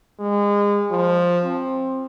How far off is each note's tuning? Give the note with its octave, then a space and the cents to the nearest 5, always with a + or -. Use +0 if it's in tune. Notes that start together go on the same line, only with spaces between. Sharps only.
G#3 -30
F3 +5
C4 +15